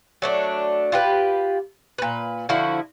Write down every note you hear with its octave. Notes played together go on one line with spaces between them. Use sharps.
F#3 A3 D4
F4 G4 B4
A#2 B4
D3 F3 E4 F#4